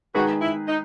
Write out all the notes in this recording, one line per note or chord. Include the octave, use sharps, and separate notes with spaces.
D#3 G#3 D#4 F#4 G#4 B4
E4
D#4